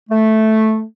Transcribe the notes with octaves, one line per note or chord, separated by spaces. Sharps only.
A3